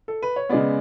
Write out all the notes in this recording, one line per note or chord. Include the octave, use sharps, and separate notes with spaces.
A4
B4
C#5
C#3 G#3 B3 D5